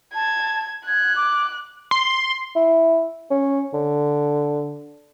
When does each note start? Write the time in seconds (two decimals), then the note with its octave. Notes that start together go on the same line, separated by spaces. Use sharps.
0.15 A5 G#6
0.87 F#6 G#6
1.16 D6
1.91 C6
2.56 E4
3.31 C#4
3.73 D3